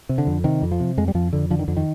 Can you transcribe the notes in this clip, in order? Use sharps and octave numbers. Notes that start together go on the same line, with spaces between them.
C3
D3
F2
C3 D#3
F2
F3
C3
F2 G#3
G3
F2 F3
F2 D3
D3 F3
D#3
F2 D3
D#3